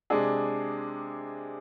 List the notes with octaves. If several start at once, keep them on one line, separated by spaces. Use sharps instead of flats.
C3 G#3 D4 G#4